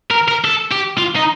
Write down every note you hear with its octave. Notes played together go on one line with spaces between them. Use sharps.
A#4
A#4
A4
G4
F4
D#4